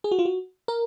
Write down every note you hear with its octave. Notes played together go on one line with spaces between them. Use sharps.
G#4
F#4
F4
F#4
A#4